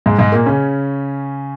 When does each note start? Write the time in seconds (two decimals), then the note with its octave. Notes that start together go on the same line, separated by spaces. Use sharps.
0.06 G#2 G#3
0.19 G#2 G#3
0.32 A#2 A#3
0.46 C#3 C#4